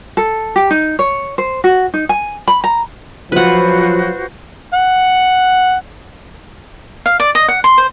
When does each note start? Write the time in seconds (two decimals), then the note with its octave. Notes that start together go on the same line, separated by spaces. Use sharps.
0.17 A4
0.56 G4
0.71 D#4
0.99 C#5
1.38 C5
1.64 F#4
1.94 D#4
2.09 G#5
2.47 B5
2.64 A#5
3.32 F3 F#3 F4 F#4 B4 C5 F#5
4.74 F#5
7.06 F5
7.20 D5
7.35 D#5
7.48 F#5
7.64 C6
7.78 C5